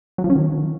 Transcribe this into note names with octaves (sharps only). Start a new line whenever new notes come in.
F#3
F3
C#4
D#3